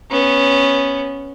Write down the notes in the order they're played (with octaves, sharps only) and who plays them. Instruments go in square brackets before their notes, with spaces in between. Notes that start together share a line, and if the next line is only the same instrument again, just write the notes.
[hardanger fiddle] B3 C#4